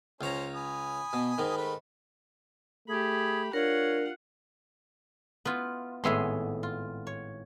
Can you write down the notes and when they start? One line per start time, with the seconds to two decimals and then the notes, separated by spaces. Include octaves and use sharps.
0.21 C#2 C#4 C5 C#5 A#5
0.55 G#5 B5 D#6
1.13 B2
1.38 G#2 D#3
1.57 A3 B4 B5
2.88 A3 G4 G#4 B5
3.53 D4 F4 A#4 C#5 F#5
5.45 B3 E4 F4
6.04 G#1 A2 B3 G#4 E5 C6
6.63 F4
7.07 C#5